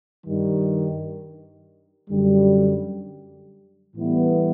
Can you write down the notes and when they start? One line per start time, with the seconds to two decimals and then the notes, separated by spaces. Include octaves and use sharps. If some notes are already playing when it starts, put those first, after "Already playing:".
0.25 G2 D#3 G3
2.10 F#2 D3 G3
3.95 A2 E3 G3 B3 E4